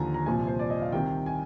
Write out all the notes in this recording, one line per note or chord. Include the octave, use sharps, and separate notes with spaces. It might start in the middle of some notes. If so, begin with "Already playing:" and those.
Already playing: D#2 D3 F3 G#5 A#5
A#5
C2 A#2 F3 G#5
C5
D5
D#5
F5
C2 C3 D#3 G5
G#5